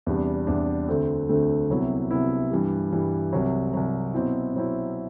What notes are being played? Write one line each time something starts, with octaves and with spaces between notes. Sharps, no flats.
E2 C3 G3 D4
E2 C3 G3 D4
D2 D3 A3 C4
D2 D3 A3 C4
C2 C3 F#3 B3 E4
C2 C3 F#3 B3 E4
G2 E3 G3
G2 E3 G3
C2 C3 F#3
C2 C3 F#3
B2 F#3 C4 E4
B2 F#3 C4 E4